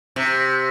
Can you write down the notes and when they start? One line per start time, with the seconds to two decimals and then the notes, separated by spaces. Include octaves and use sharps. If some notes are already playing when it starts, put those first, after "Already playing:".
0.16 C3